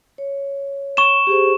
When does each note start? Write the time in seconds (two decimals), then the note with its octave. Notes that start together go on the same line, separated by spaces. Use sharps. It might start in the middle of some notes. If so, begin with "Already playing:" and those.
0.18 C#5
0.97 C#6 E7
1.27 G4 G#4 C5